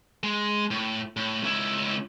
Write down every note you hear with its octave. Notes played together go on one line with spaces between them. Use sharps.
G#3
A2
A2
C#2 E4